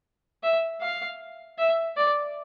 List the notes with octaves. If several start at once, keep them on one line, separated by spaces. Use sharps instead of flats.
E5
F5
E5
D5